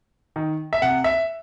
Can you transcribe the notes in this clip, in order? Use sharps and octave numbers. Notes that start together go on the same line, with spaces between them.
D#3
E5
C3 F#5
E5